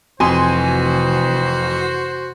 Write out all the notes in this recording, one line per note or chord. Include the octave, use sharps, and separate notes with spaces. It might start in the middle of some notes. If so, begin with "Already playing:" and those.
F1 F2 E3 F#4 C5 G#5 C6